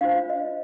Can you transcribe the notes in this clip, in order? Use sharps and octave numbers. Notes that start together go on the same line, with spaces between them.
D4 F4 C5 F5
D#5